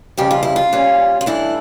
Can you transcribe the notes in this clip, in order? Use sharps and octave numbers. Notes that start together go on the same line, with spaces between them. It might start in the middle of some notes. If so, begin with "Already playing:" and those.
F2 C#3 G3 G4
F4
E4
F4
A#2 G3 C#4
F4
G2 E3 A3 D4 E4